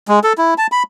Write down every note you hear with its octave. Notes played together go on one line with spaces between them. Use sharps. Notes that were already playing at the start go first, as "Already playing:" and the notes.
G#3
A4
E4
A5
B5